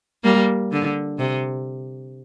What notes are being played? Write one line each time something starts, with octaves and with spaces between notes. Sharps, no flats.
G3 A#3
D3
C3